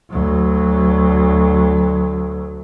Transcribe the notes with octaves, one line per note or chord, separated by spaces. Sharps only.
D2 F#3